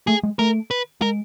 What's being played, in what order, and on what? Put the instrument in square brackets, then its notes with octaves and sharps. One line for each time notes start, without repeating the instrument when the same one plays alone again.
[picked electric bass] A3 [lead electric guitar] G#4
[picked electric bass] G#3
[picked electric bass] A3 [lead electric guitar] A#4
[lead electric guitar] B4
[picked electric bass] G#3 [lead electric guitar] A#4